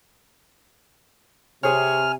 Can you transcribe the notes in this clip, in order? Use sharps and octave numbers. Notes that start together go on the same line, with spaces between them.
C3 G#4 C5 C#5 G#5 F6